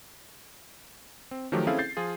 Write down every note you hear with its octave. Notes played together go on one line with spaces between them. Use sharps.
C4
D#3 F3 F#3 A3 G4
C4 C#4 E4 G#4 A4 F5
G6 A6 C7
F3 F4 G#4